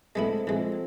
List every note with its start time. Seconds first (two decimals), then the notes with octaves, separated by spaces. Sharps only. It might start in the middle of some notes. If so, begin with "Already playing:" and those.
0.15 G#3 A3 B3 C4 E4 A4
0.47 E3 F3 G#3 C4